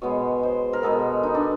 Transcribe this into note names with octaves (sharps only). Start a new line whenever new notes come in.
B2 G#3 B3 C#5
C5
A#4
B2 G#3 B3 A4
D#4
D4